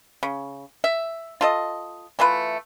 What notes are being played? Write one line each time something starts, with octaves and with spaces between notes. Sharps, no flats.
C#3
E5
F4 A4 D#5
E3 A3 F4 B4